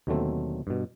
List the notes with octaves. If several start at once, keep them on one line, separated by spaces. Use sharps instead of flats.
D#2 B2 D3 F#3 A3 C4
G2 B2